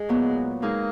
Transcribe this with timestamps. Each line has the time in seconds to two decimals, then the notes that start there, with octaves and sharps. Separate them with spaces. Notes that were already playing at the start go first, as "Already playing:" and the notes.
Already playing: G#3
0.09 A#2 F#3 B3
0.62 G#3 A#3 D#4 G#4